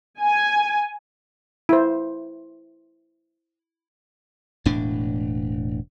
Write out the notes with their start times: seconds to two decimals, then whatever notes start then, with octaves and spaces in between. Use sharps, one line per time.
0.21 G#5
1.69 E4 C5
4.65 E1 A2 D4